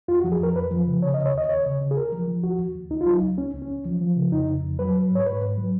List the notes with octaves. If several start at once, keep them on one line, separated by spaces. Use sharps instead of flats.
F2 F4
F#4
F3
G#4
F2 A#4
F2 B4
F3
C#3
C#3 C#5
D#5
C#3
C#5
D#2 D#5
D#2 C#5
C#3
C#3
G#4
D#2 A#4
F3
F3
D#2 F#4
D#2
D#2
C#2 D#4
F4
F#3 D#4
C#2
C#2 C#4
C#2
C#4
C#2
F3
F3
C#3
F2 D#4
C#3
F2
F#3 B4
F#3
G#2 C#5
G#2 B4
G#2
F#3